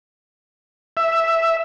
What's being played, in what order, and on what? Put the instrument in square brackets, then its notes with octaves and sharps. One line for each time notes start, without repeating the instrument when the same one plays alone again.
[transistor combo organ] E5